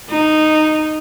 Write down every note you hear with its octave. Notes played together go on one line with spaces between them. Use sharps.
D#4